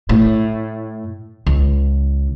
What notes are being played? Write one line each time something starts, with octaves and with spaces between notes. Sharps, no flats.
A2
C#2